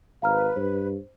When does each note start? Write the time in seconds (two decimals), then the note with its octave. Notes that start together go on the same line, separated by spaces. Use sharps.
0.22 G#1 B4 F5 A#5 F6
0.56 G2 C5